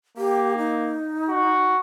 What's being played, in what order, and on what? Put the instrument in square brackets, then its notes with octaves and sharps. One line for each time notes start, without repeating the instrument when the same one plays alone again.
[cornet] A#3 [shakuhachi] G4
[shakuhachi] D#4
[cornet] F#4